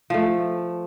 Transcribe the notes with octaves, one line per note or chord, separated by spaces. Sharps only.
F3 A3